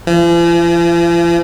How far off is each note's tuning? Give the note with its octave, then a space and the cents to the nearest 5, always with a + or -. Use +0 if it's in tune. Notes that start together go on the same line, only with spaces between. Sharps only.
F3 -45